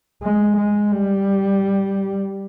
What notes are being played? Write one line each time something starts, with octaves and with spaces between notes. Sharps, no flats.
G#3
G#3
G3